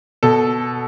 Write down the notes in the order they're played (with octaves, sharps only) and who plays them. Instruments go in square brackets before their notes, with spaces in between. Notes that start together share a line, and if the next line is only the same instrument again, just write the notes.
[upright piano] B2 A4